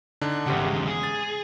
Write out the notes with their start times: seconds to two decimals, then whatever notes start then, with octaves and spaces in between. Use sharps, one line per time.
0.21 D3 D4 D#4
0.46 G#1 E2 C#3 G4 F#5
0.65 G#3
0.87 G#4
1.03 A6